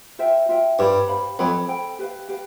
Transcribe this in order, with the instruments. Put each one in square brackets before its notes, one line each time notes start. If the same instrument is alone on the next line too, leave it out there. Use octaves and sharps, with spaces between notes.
[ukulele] F4 C5 E5 G5
F4 C5 E5 G5
[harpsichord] G2 [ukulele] G4 C5 F5 B5
[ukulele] G4 C5 F5 B5
[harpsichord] F2 [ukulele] A4 C5 G5 B5
[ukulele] A4 C5 G5 B5
G4 B4 F5
G4 B4 F5